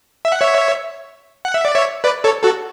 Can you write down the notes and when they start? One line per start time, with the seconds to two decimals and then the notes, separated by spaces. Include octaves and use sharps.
0.25 E5
0.32 F#5
0.41 C#5 E5
1.45 F#5
1.54 E5
1.65 D5
1.75 C#5 E5
2.04 B4 D5
2.24 A4 C#5
2.44 F#4 A4